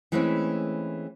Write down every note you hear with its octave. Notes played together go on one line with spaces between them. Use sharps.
E3 G#3 A3 C4 C#4 E4